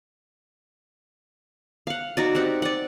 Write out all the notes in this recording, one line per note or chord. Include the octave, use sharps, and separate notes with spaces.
F5 F#5
D#4 F#4 D5
C4 G4 F#5
D5 F#5